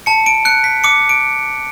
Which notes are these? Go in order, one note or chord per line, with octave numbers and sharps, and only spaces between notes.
A5 C#7
D7
F#6 C#7
B6
D6 C#7
D7